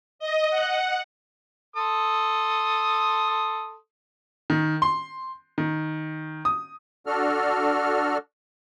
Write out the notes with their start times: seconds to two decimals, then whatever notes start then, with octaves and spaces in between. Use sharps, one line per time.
0.19 D#5
0.51 F#5
1.76 A4 C6 D#6
4.50 D#3
4.82 C6
5.58 D#3
6.45 D#6
7.07 D4 F#4 A4 F6